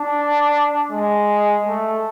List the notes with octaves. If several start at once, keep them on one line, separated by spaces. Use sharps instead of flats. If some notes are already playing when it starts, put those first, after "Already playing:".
Already playing: D4
G#3
A3